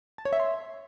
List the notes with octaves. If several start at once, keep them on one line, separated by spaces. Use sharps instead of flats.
A5
C#5
E5
C6